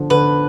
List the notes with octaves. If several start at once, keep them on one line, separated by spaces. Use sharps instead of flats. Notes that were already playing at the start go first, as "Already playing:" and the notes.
Already playing: D3 F3
D3 B4